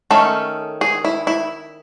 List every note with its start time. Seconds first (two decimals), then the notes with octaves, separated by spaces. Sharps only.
0.11 D#3 A3 C#4 A4
0.81 G#4
1.05 E4
1.27 E4